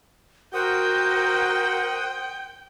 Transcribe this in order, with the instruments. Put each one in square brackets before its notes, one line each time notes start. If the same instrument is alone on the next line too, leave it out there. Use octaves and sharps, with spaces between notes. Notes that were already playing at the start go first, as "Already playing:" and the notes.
[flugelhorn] F#4 [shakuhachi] A#4 [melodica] C5 F#5 D#6 [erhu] G5